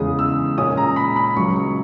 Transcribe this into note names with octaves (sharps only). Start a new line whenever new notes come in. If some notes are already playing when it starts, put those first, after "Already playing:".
Already playing: E2 C#3 G#3 D#6
E6
A#2 G#3 C#4 D#6
A#5
B5
B5
C#2 C#3 F#3 C#6
C#6